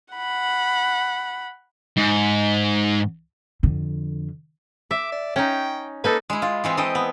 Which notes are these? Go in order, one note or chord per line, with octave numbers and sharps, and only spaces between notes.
F#5 B5
G#2
F2 D3
E5 D6
D5
C#4 D#4 G5
A#3 D#4 A4 B4
G#3 E4
F4
E3 G#3 C4
E3 A4 D#5 G5
B3